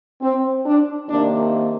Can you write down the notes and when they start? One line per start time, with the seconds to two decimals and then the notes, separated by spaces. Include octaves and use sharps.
0.21 C4
0.66 D4
1.08 C3 D#3 A#3 D4